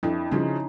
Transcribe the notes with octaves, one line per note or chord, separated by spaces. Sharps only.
F2 D4 E4
C#3 F3 C#4 D#4